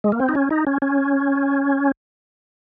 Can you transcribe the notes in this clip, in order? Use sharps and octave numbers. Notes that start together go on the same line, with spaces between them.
G#3
A#3
C4
D#4
C#4
D#4
C#4
C#4